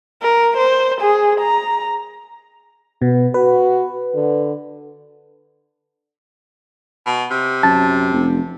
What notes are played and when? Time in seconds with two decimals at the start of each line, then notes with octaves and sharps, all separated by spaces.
0.22 A#4
0.57 C5
1.01 G#4
1.40 A#5
3.02 B2 B3
3.34 F#4 B4
4.14 D3
7.07 B2
7.31 C3
7.63 F#2 A5
8.13 F1